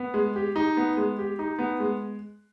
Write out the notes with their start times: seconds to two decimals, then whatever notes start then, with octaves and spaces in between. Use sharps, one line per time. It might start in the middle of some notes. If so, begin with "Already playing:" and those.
Already playing: B3
0.14 G#3
0.36 G4
0.56 D#4
0.77 B3
0.97 G#3
1.18 G4
1.39 D#4
1.59 B3
1.80 G#3